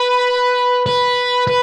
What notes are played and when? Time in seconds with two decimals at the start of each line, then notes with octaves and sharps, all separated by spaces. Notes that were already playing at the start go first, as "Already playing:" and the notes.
Already playing: B4
0.86 B4
1.47 B4